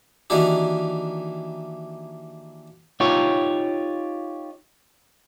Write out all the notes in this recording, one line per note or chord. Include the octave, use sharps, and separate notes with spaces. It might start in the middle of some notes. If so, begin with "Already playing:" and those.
D#3 E3 A#3 D4 F#4 G4
D#4 F4 G4 C#5